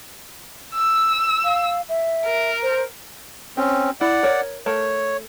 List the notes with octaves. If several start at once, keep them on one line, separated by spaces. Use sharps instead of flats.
E6
F5
E5
A#4
C5
C4 C#4 G4
E4 D5 F#5
A#4 C#5
A3 A#4 C#5